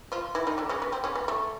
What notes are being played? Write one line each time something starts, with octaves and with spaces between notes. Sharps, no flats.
F3 F4
E3 E4
D#3 D#4
D3 D4
C#3 C#4
B3
C4
C#3 C#4
B3
A3